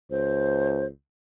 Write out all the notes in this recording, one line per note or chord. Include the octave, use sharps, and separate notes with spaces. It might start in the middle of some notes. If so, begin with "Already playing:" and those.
C#2 C5